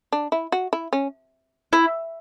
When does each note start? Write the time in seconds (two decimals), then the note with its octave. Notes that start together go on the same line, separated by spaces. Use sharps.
0.12 D4
0.32 E4
0.52 F#4
0.73 E4
0.93 C#4
1.73 E4